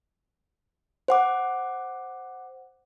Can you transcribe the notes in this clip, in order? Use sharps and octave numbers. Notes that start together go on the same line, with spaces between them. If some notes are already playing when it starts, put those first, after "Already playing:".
C5 F#5 D6